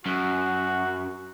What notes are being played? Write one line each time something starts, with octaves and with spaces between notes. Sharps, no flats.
F#2 F#4